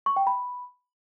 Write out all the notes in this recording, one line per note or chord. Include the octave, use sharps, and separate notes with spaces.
C#6
G5
B5